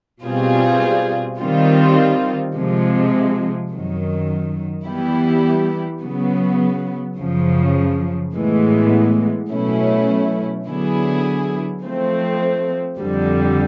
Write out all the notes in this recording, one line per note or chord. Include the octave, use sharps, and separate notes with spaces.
B2 G3 C4 F4 G#4
D#3 G3 C4 F4
C3 F3 G#3
F#2 D#3 F#3
E3 G3 B3 E4 G4
C#3 F#3 B3
F#2 C#3 F3
A2 E3 G#3 B3
B2 F#3 A3 C#4 E4
D3 F#3 B3 E4 G#4
F3 A3 C4
F2 D3 G3